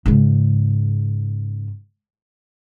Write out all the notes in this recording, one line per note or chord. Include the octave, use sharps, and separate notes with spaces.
G#2 C#3